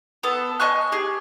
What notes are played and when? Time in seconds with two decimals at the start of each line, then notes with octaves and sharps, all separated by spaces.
0.23 B3 A4
0.60 D#5 G#5 C#6 F#6
0.92 G4 G#4